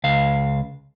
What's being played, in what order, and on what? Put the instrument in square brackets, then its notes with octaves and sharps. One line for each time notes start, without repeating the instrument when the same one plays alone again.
[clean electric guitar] C#2 F5